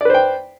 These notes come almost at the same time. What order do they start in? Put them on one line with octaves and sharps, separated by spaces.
D5 B4 C5 G5